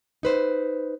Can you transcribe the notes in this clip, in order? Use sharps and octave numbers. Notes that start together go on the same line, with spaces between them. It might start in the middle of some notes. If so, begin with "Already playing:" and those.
D#4 B4 C5